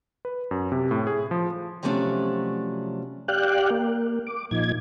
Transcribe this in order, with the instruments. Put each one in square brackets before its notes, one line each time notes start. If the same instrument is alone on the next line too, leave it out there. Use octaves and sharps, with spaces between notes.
[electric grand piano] B4
F#2
C3
A2
G#4
F3
[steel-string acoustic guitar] C3 F3 F#3 A3 C#4 D4
[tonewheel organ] G4 D5 F5 G5 F#6
A#3
D6
A#2 F3 D#4 G#6